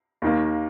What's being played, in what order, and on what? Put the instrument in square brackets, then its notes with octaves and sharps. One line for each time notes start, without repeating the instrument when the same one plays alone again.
[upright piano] D#2 D#3 A#3